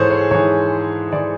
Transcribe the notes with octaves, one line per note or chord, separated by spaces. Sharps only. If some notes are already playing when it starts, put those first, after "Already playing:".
Already playing: G#2 E3 G#4 A4 C5 C#5
C#5
G#2 E3 C#5
E3 D5